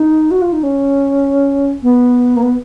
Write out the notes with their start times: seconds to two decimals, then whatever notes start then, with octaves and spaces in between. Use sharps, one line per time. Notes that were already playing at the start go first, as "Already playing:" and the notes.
Already playing: D#4
0.31 F#4
0.42 F4
0.53 D#4
0.63 C#4
1.83 B3
2.37 A#3
2.42 B3